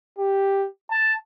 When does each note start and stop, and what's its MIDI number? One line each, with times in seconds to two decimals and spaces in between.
0.19 0.67 67
0.91 1.14 81